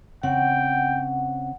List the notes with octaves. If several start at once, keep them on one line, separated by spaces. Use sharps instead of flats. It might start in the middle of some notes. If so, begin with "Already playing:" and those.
C#3 C4 F#5 G5